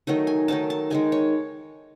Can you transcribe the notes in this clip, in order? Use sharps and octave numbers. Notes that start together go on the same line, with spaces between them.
D#3 F#3 A3 D#4 D#5
G#5
D#3 F#3 A3 D#4 A5
A5
D#3 G#3 D#4 G#5
C#5